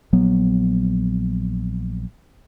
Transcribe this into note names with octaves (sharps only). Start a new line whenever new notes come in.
A#1 F#3 B3